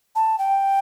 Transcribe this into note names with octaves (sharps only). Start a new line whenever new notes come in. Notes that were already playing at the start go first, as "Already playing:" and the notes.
A5
G5